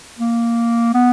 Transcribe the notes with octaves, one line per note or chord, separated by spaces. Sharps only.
A#3
B3